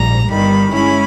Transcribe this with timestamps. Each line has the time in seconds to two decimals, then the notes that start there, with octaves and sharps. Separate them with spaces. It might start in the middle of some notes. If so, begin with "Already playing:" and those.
Already playing: A#1 G#2 G3 A#5
0.29 G1 G2 D#3 G3 B5
0.73 G#3 C#4 E4 B5